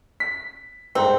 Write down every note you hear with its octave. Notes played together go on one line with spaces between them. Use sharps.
B6
C2 G#2 C4